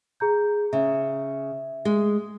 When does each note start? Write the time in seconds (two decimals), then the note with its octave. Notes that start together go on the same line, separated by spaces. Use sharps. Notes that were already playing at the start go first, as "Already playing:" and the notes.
0.20 G#4 A#5 G6
0.73 C#3 E5
1.85 G#3